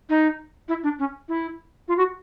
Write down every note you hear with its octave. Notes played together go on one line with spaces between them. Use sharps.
D#4
E4
D4
C#4
E4
F4
F#4